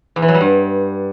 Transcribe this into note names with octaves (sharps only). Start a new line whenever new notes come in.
E2
E3
F#3
G3
G2